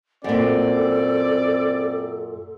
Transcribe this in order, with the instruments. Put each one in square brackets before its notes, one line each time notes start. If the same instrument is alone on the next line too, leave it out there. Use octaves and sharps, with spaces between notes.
[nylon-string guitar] F#2 A#2 [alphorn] C4 [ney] A4 [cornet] D5